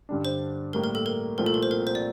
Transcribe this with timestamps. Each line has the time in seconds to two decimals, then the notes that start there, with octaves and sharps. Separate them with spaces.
0.09 G2 D3 G3 D4
0.25 C5
0.73 A2 G3 A#3 A#4
0.84 A#4
0.95 A4
1.06 A#4
1.38 C2 A#2 F3 A3 C4 A#4
1.46 A4
1.54 A#4
1.63 C5
1.71 A#4
1.87 C5
1.95 D5